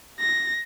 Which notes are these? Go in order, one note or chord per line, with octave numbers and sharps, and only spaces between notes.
A#6